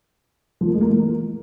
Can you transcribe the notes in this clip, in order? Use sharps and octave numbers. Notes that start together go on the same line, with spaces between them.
F3
A#3
G#3
A#3
E3